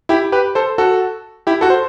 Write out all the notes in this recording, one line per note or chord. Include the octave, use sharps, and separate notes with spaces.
E4 G4
G4 B4
A4 C5
F#4 A4
E4 G4
F#4 A4
C5